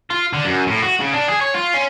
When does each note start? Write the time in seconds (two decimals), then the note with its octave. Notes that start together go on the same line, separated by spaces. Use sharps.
0.10 F4
0.33 D3
0.45 F#2
0.67 A2
0.82 F#4
1.00 C#3
1.13 D4
1.28 G#4
1.41 C#5
1.55 F4
1.74 C#4